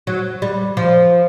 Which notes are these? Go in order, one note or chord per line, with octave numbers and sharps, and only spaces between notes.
F#3
G3
F3